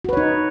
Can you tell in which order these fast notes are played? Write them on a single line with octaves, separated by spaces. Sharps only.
F#4 B4 C#5 D#4